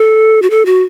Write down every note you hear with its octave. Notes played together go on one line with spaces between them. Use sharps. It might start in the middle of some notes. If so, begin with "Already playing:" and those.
Already playing: A4
F#4
A4
F#4